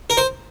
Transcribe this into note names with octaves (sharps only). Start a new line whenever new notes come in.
A#4
C5